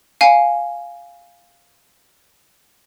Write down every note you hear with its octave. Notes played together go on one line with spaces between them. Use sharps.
F5 G#5